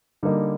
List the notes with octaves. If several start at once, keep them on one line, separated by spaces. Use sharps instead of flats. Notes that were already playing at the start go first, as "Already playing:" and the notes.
D3 G3 A#3 D#4